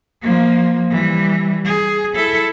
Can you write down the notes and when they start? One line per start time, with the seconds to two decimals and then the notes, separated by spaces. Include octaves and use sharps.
0.22 F3 A#3
0.90 E3 G3
1.65 G#4
2.15 E4 A4